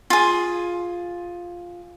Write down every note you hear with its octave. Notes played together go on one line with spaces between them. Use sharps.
F4 G#4